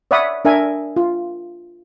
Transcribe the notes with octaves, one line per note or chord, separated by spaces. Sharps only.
C#5 D5 E5 F#5 B5 D#6
D4 A#4 E5 G#5
F4